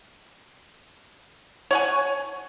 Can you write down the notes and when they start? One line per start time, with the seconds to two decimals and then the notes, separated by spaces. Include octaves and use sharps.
1.71 C#5 F#5 G#5